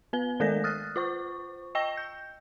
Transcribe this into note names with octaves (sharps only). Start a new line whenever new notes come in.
B3 B4 G7
D#3 G#3 A4 A#4 D5 A#6
D#6 F6 F#6 A6
F4 C5 C#6
D#5 G5 C#6 E6 A#6 G7
G6